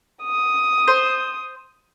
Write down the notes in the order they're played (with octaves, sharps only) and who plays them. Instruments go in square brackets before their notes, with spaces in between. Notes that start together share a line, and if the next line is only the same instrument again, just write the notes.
[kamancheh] D#6
[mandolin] C5